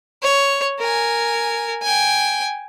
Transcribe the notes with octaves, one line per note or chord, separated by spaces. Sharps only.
C#5
A#4 G#5
G5 G#5